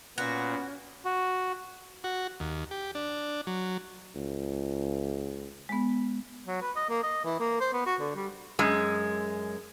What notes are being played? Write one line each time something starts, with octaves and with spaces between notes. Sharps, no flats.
A#2 B3 C#4 F#4
F#4
F#4
D#2
G4
D4
F#3
C#2
G#3 B3
F#3
B4
D#5
A#3
D#5
E3
A#3
C5
B3
F#4
D3
G3
F#2 G#3